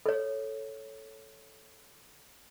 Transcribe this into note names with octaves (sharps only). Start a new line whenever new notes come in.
A4 C#5